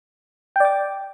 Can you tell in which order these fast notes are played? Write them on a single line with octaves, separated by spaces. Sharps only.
G5 D5 D6